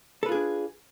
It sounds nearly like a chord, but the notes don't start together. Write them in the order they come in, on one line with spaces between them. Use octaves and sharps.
A4 B4 F4 G#4 D4